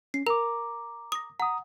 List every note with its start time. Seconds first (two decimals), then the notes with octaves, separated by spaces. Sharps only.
0.14 C#4 C7
0.27 A#4 A#5 D6
1.12 D#6 A#6
1.40 F#5 A#5 D#6